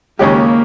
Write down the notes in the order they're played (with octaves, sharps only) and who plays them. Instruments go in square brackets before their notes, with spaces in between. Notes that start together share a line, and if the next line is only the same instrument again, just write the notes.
[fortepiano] D#2 C#3 G#3 C#4 G4 [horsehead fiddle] A#3